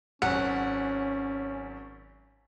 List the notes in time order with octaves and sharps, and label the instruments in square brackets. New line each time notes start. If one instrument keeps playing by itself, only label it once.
[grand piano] G#1 F#2 [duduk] C#4 [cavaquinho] F#5